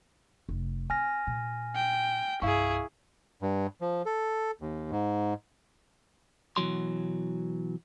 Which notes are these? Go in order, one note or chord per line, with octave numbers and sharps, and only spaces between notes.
F1
C4 G#5 F6 A#6
A#2
G5
C2 G2 E4 G#4 F5 C#6
G2
F3
A4
D#2
G#2
B2 E3 F#3 C6